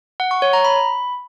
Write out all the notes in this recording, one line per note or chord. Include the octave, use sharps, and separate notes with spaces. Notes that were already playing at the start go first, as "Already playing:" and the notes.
F#5
C#6
C#5
A#5
B5